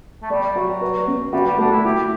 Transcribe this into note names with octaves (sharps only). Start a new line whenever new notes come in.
A3
G3 D5
F#3 F#4
B4
C#4
G3 F#4
G3
A3 D4
E4
E4 G4